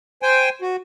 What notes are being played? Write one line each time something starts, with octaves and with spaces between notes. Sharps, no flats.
C5 G5 G#5
F#4